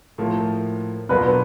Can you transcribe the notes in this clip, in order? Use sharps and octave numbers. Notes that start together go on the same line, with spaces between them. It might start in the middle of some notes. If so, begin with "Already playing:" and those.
A2 F3 A#3
B2 F#3 A#3 D4 F4 B4